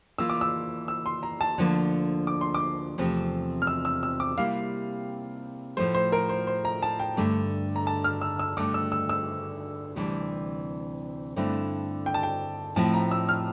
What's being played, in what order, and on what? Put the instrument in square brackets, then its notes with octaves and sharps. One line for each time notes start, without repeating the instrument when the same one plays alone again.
[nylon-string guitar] E3 A#3 F4 [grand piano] E6
[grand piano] D6
E6
E6
C6
A#5
A5
[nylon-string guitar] D2 D3 F3 A#3 D4
[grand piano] D6
C6
D6
[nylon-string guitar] E2 C3 F3 A3 C4
[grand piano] F6
E6
E6
E6
D6
[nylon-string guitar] C3 G3 A#3 E4 [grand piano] F5
[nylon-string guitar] A2 F3 A3 [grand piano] C5
[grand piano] C5
A#4
C5
C5
A#5
A5
G5
[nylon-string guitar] G2 D3 A3
[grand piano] A#5
A5
F6
E6
E6
[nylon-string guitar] G2 D3 A3 [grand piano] D6
[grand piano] E6
E6
E6
[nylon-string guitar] D2 C3 E3 G3 D4
G2 D3 A3 C4 E4
[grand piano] G5
A5
G5
[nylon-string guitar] A2 F3 C4 E4 [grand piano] A5
[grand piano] A#5
E6
F6